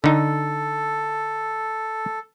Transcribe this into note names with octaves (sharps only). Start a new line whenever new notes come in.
D3 D#4 A4